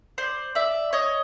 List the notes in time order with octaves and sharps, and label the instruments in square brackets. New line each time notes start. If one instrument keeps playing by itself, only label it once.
[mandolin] C5 D5
D5 E5
C#5 D#5